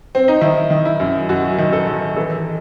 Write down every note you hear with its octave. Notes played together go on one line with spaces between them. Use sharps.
C4
D#4
D#3 E4
D#3
E4
F#2
F#2 F#4
D#3
A4
D#3
E3 A4